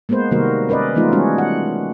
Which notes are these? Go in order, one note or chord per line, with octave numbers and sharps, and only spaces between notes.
G#3 A#3 B3 B4 C5
C3 D#3 G3 A#3 F#4 A#4
C#4 A#4 B4 D5 D#5
E3 G#3 A3 B3 D#4 F4
G3 G#3 B3 C#4 F#4
F#5